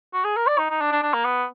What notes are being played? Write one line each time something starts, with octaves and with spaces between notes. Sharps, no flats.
F#4
G#4
A#4
D5
D#4
D#4
D4
D4
D4
A#3
B3